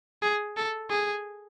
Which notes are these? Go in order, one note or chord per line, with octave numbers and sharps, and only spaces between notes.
G#4
A4
G#4